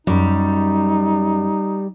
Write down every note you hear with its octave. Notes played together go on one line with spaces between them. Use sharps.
F#2 G3 D#4